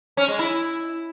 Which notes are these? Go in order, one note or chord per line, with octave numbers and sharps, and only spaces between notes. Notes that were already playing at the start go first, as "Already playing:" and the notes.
C#4
G#3
E4